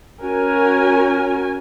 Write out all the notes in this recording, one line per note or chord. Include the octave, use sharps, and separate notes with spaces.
C#4 F#4 A#4 G#5